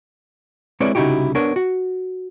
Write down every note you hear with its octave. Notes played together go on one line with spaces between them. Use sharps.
G#3 C4 E4 B4 C#5 D5
C2 C#3 D#4 E4 F#4 G4
B3 D4 A#4 C#5
F#4